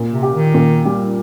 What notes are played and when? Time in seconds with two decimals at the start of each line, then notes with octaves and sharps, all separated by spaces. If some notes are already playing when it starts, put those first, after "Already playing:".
Already playing: A#2
0.13 C3
0.23 G4
0.33 D#3
0.54 A#2
0.85 G3